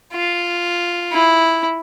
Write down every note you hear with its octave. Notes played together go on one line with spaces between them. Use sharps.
F4
E4